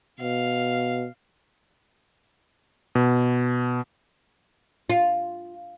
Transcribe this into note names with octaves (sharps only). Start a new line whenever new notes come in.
B2 F5
B2
F4